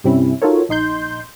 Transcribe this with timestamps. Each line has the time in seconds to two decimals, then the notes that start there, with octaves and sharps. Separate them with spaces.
0.04 G2 C3 G3 C4 C#4 E4
0.42 D#4 F4 F#4 A4 A#4 C#5
0.69 A#1 D#4 C6 G6